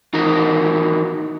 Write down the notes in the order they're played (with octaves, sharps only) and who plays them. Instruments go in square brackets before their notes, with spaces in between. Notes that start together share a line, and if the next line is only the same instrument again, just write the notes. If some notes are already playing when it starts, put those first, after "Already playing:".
[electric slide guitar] E3 D#4 F#4 A#4